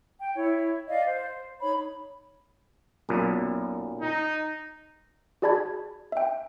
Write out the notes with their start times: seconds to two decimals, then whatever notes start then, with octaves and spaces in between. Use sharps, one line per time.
0.19 G5
0.35 E4 C#5
0.89 D5 D#5 F5
1.05 C5
1.61 D#4 C#5 B5
3.09 B1 F#2 A#2
4.02 D#4
5.42 F#4 G#4 D5 A5 B5 G#6
6.12 E5 G5